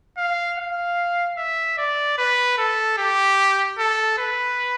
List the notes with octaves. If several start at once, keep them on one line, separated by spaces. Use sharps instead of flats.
F5
F5
E5
D5
B4
A4
G4
A4
B4